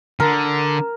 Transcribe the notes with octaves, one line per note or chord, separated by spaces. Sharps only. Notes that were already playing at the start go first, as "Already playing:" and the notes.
D3 A#4